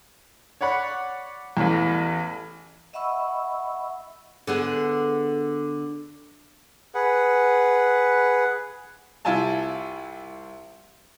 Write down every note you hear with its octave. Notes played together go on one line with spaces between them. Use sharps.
C#5 D5 F#5 B5
A1 E2
D#5 E5 F#5 B5 C#6 E6
D3 B3 G#4
G#4 B4 F#5
C2 E4 F4 G#5 A5